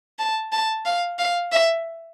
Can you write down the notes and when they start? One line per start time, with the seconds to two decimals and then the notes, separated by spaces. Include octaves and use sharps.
0.19 A5
0.52 A5
0.86 F5
1.19 F5
1.52 E5